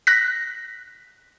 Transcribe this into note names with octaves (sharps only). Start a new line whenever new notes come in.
F#6 A#6 B6